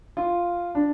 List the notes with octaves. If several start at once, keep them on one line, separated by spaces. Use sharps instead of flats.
F4
D4